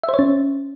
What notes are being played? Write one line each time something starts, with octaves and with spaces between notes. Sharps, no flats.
E5
C5
C#5
C#4